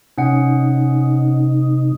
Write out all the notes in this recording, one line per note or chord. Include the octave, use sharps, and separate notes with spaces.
C3 C#4 D#4 F#5